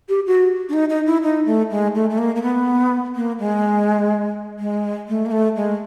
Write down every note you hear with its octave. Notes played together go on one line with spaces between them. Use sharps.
G4
F#4
D4
D#4
D#4
E4
D#4
A3
G#3
A3
A3
A#3
A#3
B3
A#3
G#3
G#3
A3
A#3
A3
G#3